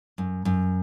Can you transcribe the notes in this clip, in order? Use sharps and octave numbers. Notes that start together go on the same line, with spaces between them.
F#2
F#2